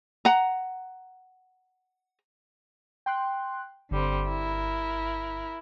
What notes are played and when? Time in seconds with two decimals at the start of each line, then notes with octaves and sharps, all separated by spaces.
0.25 F#5 A#5
3.06 G5 C6 F#6
3.91 G1 D3 G3 C4
4.28 E4 A#4